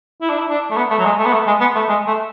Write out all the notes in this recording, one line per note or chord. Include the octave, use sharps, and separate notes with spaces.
E4
D4
E4
D4
A3
B3
A3
F#3
G#3
A3
B3
A3
G#3
B3
A3
G#3
A3